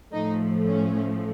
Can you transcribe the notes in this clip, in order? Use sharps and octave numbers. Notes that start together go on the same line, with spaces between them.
A2 F3 A3 D#4
C#4